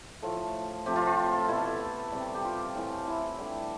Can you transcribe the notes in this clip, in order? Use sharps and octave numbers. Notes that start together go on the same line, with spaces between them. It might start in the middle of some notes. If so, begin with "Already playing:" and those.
A2 F3 A3
C3 F3 A3 G4
F4
F4
A4
B2 A3 E4
C3 G3
G4
F4
A2 E3 A3
E4
D3 G3